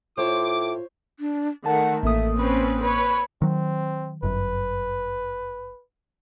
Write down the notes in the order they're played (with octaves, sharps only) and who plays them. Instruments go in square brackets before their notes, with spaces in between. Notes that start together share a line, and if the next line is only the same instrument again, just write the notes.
[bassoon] A2 [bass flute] F4 [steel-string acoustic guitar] C5 C#5 [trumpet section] D6
[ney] D4
[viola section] D#3 A3 [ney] F#5 [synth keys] A5
[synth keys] A1 A#3 D#6 [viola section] A3 [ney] E5
[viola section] C4 C#4 B4 [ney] B5
[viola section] B4 C#5 [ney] B5
[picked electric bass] D#3 F#3 [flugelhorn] C4
[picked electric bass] G1 F#2 [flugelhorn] B4